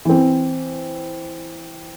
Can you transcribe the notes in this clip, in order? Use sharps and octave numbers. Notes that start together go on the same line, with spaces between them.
E3 C4